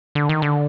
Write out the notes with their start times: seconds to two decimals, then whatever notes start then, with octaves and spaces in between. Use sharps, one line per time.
0.15 D3
0.29 D#3
0.42 D3